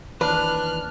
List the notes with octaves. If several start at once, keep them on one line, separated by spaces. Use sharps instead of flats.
D#2 E3 D4 B4 F6 F#6